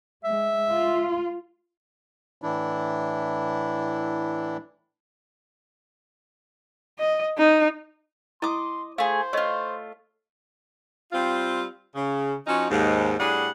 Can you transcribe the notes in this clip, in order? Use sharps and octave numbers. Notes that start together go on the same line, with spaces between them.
G#3 E5
F4
A2 E3 D4 E4
D#5
D#4
E4 D#5 C6 D6 D#6
A3 G#4 C5 F5
A3 F4 C#5 D#5
G3 C4 F4
C#3
F3 C#4 D#4 F#4
D#2 G#2
A2 G3 D4 G#4 F#5